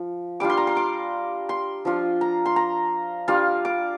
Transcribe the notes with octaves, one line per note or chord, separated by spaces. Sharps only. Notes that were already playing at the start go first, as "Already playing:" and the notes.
Already playing: F3
G3 D4 F4 D6
C6
A#5
C6
D6
C6
F3 D4 F4
A#5
C6
A#5
G3 D4 F4 F5
D6